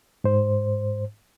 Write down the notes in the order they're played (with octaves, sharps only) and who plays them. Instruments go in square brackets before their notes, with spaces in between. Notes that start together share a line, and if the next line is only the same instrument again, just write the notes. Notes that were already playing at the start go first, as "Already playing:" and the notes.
[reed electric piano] G#2 C5